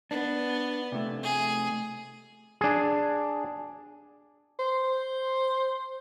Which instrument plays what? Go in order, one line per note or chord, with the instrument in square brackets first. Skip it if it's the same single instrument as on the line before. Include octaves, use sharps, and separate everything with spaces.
[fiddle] B3 [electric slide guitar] D4
[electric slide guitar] C3 A3
[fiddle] G#4
[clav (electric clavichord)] D4 G#4
[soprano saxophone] C5